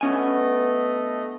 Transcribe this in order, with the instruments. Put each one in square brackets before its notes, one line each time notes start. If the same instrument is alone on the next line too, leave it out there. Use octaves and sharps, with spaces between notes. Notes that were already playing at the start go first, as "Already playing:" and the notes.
[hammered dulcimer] B2 D3 G3 [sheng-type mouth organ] A3 D#5 [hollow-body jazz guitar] C#4 G#5